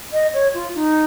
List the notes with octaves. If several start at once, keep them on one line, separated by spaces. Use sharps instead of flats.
D#5
C#5
F4
D#4